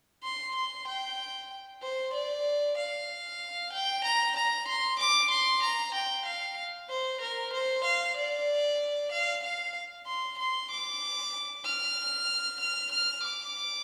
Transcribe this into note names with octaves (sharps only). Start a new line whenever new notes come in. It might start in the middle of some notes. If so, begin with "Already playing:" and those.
C6
C6
G5
C5
D5
F5
G5
A#5
A#5
C6
D6
C6
A#5
G5
F5
C5
A#4
C5
F5
D5
F5
F5
C6
C6
D6
F6
F6
F6
D6